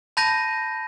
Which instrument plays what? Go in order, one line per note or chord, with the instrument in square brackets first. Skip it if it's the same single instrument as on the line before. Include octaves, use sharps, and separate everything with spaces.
[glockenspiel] A5 B5 G6 A#6 D#7